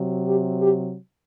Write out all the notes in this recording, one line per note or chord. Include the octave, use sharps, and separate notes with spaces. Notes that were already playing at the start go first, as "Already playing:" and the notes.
Already playing: C3 F#3
G4
G4